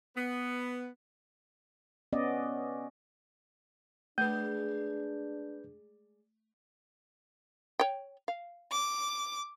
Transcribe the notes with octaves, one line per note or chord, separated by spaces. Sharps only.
B3
B3 C#4 D5 D#5
G#3 A3 D4 G#4 B4 D5 G6
C#5 G5
F5
D6